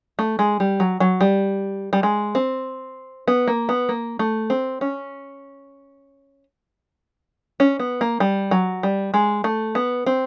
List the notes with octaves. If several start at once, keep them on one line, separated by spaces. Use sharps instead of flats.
A3
G#3
G3
F#3
F#3
G3
G3
G#3
C4
B3
A#3
B3
A#3
A3
C4
C#4
C#4
B3
A#3
G3
F#3
G3
G#3
A3
B3
C4